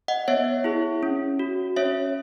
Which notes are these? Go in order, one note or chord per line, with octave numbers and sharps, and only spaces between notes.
D#5 F#5
B3 C#5 E5
E4 G#4
C#4
F#4
C#4 C#5 E5